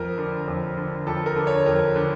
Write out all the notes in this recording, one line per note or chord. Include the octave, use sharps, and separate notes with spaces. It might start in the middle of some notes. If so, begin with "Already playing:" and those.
Already playing: F2 A#4
D3
F2
D3
F2 A4
A#4
D3
C#5
F2 A#4
D3